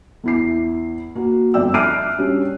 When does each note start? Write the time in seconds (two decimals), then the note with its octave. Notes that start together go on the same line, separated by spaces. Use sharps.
0.24 E2 E4 C7
1.15 A#3 F#4
1.54 G1 F2 D5 E5 G5 E6
1.74 E5 F6 F#6 C7 D7 D#7
2.19 G3 C#4 D4